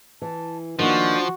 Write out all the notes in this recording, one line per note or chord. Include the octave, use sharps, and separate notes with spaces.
E3 A5
D#3 F3 A#3 D4 F#4